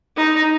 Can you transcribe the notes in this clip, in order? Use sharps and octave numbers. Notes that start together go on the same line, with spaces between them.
D#4